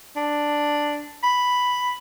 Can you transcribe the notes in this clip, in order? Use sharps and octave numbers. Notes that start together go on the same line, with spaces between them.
D4
B5